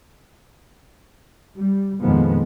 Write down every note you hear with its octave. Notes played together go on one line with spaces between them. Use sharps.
G3
F2 A#2 D#3 F3 G#3 B3